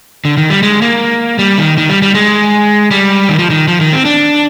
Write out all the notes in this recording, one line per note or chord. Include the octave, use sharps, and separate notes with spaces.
D3
D#3
G3
G#3
A#3
G3
D#3
D#3
G3
G3
G#3
G3
D#3
F3
D#3
F3
D#3
C4
D4